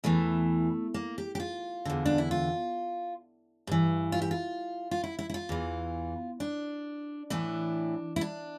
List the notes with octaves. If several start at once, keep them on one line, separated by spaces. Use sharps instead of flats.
E2 E3 A3
A#3
G4
G4
F4
E2 D3
D4
E4
F4
G2 E3
F4
G4
F4
F4
E4
E4
E4
F4
E2 E3
D4
A2 E3 D4
E4
D4